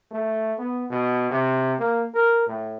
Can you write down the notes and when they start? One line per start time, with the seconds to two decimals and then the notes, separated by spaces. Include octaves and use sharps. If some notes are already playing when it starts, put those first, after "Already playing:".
0.11 A3
0.58 B3
0.90 B2
1.31 C3
1.79 A#3
2.14 A#4
2.47 A2